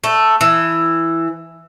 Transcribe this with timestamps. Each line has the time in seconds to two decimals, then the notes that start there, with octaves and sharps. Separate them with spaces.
0.04 A3
0.41 E3